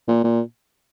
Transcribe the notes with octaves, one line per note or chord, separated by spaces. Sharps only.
A#2
A#2